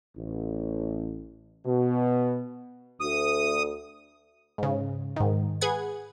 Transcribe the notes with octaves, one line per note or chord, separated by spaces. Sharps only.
A1
B2
D2 D#6
G#2 C#3
G#2 D#3
G#4 B4 F#5 G#6